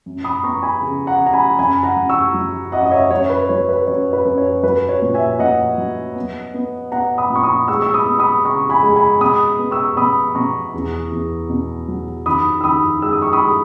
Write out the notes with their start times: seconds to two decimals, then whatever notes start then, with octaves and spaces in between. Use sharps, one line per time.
0.06 F#2
0.24 B5 D#6
0.43 B3 A#5 C#6
0.63 G#5 B5
0.82 C#3
1.07 F#5 A#5
1.21 C#3
1.26 A#5
1.33 G#5 B5
1.59 F#2 G#5 B5
1.83 F#5 A#5
1.96 F#2
2.10 C#6 E6
2.34 F#3
2.72 F#2 D#5 F#5
2.86 D#5
2.91 C#5 E5
3.11 F#2 C#5
3.30 B4
3.49 F#3 C#5
3.69 B4
3.87 F#2 C#5
4.13 B4
4.25 F#2
4.38 C#5
4.63 F#3 B4
4.89 C#5
5.02 A#2
5.14 E5 G#5
5.39 A#2 D#5 F#5
5.78 F#3
6.15 B3
6.54 B3
6.92 B3 F#5 A#5
7.18 B5 D#6
7.30 A#2
7.36 C#6
7.43 B5 D#6
7.68 G#3 C#6 E6
7.82 E6
7.94 B5 D#6
8.06 B3
8.19 B5 D#6
8.45 C#3 A#5 C#6
8.70 G#5 B5
8.83 G#3
8.96 G#5 B5
9.20 B2 B5 D#6
9.59 B3
9.71 C#6 E6
9.97 B2 B5 D#6
10.35 B2 A#5 C#6
10.74 E2
11.12 E2
11.50 B2
11.88 F#3
12.26 D#3 B5 D#6
12.61 E6
12.64 D#3 B5 D#6
13.02 G#3 E6
13.12 D#6
13.22 C#6
13.33 B5 D#6
13.41 G#3